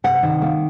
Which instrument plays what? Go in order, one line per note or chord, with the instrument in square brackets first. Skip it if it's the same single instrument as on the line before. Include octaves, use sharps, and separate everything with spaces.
[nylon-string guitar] C3 F#5
D#3
A#3